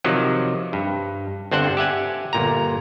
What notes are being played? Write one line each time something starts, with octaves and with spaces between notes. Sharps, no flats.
C3 D#3 F3 F#3
G2
G1 C4 D4 C5 F#5
G4 E5 F#5 G#5
G1 A#2 A#5